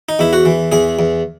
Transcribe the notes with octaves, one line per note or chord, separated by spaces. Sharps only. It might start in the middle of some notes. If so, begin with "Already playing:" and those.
D#4
E2 E4
F#4
E3
E2 G#4
E2